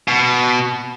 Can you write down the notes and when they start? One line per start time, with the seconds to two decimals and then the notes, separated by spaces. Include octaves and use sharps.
0.08 B2